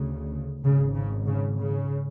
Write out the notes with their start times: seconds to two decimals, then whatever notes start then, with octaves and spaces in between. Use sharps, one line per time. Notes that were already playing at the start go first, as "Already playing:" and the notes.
Already playing: D2 C#3
0.63 G#1 G#2 C#3
0.95 C#3
1.27 C#3
1.58 C#3